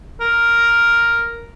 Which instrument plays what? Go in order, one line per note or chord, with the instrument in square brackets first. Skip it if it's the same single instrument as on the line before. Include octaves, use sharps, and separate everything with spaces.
[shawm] A#4